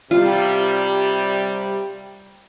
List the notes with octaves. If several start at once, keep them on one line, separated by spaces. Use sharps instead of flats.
C3 G3 F4